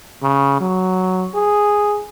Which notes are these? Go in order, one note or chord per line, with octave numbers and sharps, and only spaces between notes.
C#3
F#3
G#4